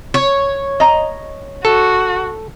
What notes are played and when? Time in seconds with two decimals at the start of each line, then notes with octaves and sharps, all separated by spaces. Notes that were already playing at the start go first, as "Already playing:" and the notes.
0.14 C#5
0.80 D#5 A#5
1.65 F#4 A4